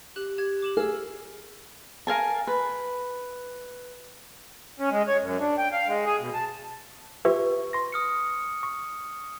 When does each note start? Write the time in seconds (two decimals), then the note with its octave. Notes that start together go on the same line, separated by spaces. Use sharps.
0.16 G4 F#6 F#7
0.38 G4 G#6
0.62 D6 E7 F#7
0.77 G#4 E6 F6
2.07 A#4 F5 G#5 A5
2.47 B4
4.79 C#4
4.91 G#3
5.08 C#5
5.22 F#2
5.40 D4
5.58 G5
5.72 F5
5.88 G#3
6.05 G#4
6.20 B2
6.34 A5
7.25 F4 G4 B4 E5 C#6
7.73 C6 A#6
7.92 D#6 F6 C#7
8.63 C#6